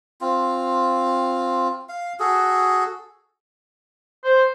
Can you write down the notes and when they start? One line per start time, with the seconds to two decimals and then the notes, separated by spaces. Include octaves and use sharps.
0.21 C4 F4
1.89 F5
2.20 F#4 G#4 A4
4.24 C5